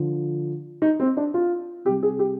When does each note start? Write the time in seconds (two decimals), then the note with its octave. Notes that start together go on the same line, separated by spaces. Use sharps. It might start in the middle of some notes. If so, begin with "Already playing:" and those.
Already playing: D3 F3
0.82 D#4
1.00 C4
1.17 D4
1.34 F4
1.85 C3 G4
1.89 G3
2.03 G#4
2.19 G4